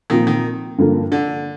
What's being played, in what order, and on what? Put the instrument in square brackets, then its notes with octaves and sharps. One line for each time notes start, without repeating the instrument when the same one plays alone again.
[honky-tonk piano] A#2 F3 C4 [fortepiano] D#3
[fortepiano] D#3
[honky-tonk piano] G2 D3 F3 A#3
[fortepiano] D3